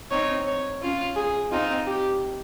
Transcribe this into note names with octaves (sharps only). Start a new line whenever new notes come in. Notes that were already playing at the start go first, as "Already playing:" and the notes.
C4 D#4 C#5
C#5
C#4 F4
G#4
C4 D#4 F4
G4